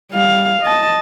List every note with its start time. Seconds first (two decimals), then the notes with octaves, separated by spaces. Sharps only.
0.11 G3 F5
0.62 D#5 A5